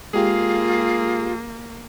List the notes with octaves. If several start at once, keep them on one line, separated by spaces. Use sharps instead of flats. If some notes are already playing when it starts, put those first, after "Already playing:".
G#3 A#3 F4 G4 G#4